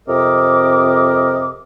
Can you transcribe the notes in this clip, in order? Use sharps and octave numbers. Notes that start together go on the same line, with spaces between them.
F2 C3 A#4 D#5 D6